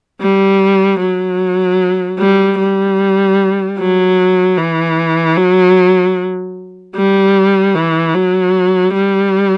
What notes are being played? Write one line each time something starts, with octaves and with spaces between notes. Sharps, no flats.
G3
F#3
G3
G3
F#3
E3
F#3
G3
E3
F#3
G3